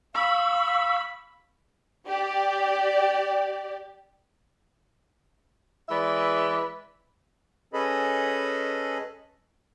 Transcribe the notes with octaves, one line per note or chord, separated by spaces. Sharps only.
F5 B5 C#6 E6
G4 D5
E3 G#3 B4 D5 E5
C#4 G#4 A4 B4 D#5 B5